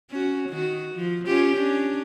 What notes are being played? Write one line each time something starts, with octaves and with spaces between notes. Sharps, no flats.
C#4 F#4
D#3 F#4
F3
C#4 F4 G4
C#4 D4